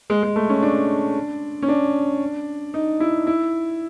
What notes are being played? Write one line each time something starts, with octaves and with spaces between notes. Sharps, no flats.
G#3
G#3
A3
C#4
D4
C#4
D4
D#4
E4
E4